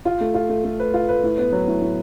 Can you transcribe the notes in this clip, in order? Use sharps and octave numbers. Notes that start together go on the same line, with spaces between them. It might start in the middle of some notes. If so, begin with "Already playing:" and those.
F4
A3
F4
A3
A3
B4
F4
B4
A2
B3
F#3
A2
A2